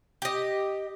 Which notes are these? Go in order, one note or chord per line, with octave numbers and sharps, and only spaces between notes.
G4 D#5